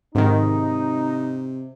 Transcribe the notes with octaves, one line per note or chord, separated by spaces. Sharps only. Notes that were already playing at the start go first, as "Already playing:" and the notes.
G#2 C3 D#3 D#4